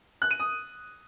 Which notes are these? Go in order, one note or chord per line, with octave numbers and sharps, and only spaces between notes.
F#6
D#7
D#6